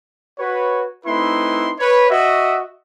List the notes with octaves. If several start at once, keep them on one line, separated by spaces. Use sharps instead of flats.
F#4 B4 C#5
A3 C4 D#4 E4 B4 C6
B4 C#5
F#4 D#5 E5